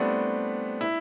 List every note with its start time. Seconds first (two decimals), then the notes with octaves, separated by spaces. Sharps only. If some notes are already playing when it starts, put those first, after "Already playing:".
Already playing: G3 A3 B3 C4 D4 E4
0.81 E4